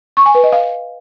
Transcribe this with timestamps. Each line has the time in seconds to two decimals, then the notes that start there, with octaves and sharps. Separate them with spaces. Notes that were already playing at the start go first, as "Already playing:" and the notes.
0.17 C#6
0.26 G#5
0.35 B4
0.44 D#5
0.52 F5